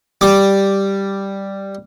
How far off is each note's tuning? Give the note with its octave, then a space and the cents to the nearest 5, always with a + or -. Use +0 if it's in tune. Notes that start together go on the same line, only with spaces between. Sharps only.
G3 +0 D6 +0